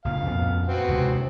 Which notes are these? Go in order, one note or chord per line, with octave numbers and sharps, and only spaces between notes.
C#2 A#2 F5
F2 A#2 B3
B3 C4 F#4
D#2 C3 G#3